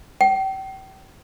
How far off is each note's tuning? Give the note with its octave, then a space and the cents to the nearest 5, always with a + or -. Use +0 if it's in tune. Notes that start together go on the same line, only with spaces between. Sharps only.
G5 -35